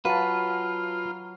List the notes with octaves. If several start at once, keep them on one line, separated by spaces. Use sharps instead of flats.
F#3 F4 B4 F5 A5 A#5